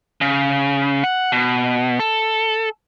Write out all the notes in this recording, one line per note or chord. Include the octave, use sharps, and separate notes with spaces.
C#3
F#5
B2
A4